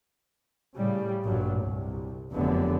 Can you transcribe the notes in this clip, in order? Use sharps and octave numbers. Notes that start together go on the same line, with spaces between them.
A2 C#3 G3
A1 G2 A#2 F#3
C2
F1 F#2 D3 B3